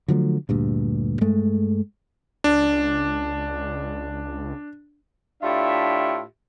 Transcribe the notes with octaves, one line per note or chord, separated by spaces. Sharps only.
D3 F3 F#3 A3
D2 G2 A#2
G2 G#3 A3
C#2 D4
A2 D4 F4 G4 E5